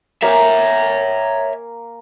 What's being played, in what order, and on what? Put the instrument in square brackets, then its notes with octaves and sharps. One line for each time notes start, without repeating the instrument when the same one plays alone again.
[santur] A#3 A#4 G#5 [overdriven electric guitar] C#5 E5